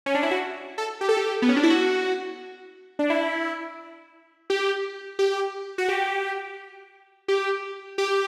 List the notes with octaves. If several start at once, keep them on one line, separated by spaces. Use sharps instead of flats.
C#4
D4
E4
F#4
A4
G4
A4
G4
B3
C#4
D4
E4
F#4
D4
E4
G4
G4
F#4
G4
G4
G4